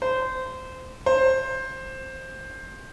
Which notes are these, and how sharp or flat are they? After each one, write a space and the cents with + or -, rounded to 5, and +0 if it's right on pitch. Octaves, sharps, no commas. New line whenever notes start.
C5 -20
C5 +10